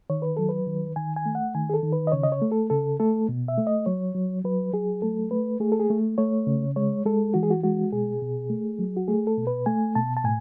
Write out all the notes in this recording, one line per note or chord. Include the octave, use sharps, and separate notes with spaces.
D#3 C#5
B4
F#3 A4
B4
D#3
D#3 G#5
G#5
A3
F#5
D#3 G#5
G#4
A4
D#3
B4
D#5
C#3 C#5
D#5
C#5
A3
A4
C#3 A4
A3 A4
B2
E5
A3
D#5
F#3 C#5
F#3
F#3 B4
F#3 G#4
A3 A4
A3 B4
A3 G#4
A4
G#4
A3
A3 C#5
C#3
G#3 C#5
G#3 A4
E3 F#4
G#4
F#4
G#3 F#4
B2 G#4
B2
A3
F#3
F#4
A3 G#4
A4
B2
B4
A3 G#5
B2 A5
A5
A2 G#5